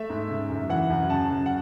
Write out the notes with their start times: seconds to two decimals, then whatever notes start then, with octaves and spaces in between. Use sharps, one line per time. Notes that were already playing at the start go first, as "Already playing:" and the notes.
Already playing: A3 E5
0.10 G#2
0.30 C#3
0.50 F#2
0.70 E3 F#5
0.90 F#2
1.10 C#3 A5
1.30 F#2
1.46 F#5